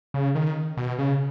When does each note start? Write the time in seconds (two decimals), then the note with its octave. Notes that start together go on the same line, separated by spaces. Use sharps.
0.14 C#3
0.35 D#3
0.77 B2
0.99 C#3